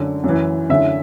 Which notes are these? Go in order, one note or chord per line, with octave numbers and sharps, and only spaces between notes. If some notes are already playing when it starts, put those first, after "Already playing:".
Already playing: F#2 D3
F#2
E3
F#2 D3 E5